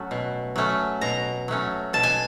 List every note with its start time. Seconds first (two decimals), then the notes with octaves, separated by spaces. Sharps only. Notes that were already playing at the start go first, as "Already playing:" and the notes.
Already playing: F#3 A3 C#4
0.11 B2
0.56 F#3 A3 C#4
1.01 B2 A#5
1.48 F#3 A3 C#4
1.93 B2 A5
2.03 G#5